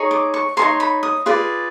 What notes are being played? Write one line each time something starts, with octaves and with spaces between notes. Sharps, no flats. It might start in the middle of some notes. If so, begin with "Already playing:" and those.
Already playing: D#4 G#4 C#5
D6
C#6
D#4 G#4 C#5 C6
B5
D#6
F4 G#4 B4 D5